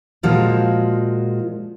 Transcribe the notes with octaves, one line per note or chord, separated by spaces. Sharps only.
A#2 F3 G#3 F4 F#4